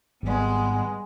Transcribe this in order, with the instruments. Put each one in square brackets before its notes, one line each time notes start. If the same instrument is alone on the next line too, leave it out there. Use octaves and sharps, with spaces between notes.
[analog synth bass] G#1 [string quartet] G3 G#3 [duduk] B3